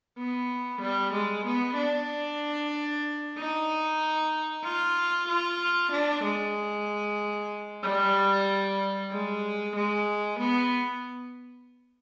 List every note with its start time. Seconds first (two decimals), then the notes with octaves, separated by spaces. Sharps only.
0.18 B3
0.82 G3
1.13 G#3
1.46 B3
1.77 D4
3.38 D#4
4.64 F4
5.29 F4
5.92 D4
6.24 G#3
7.84 G3
9.12 G#3
9.76 G#3
10.40 B3